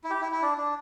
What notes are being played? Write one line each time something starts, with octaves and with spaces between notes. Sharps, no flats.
E4
G4
E4
E4
D4
D4